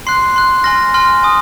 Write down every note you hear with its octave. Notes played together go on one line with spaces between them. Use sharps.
C6 F#6 C7
C6 F#6
G#5 C6 F6 A#6
G#5 C6 F6
G#5 D#6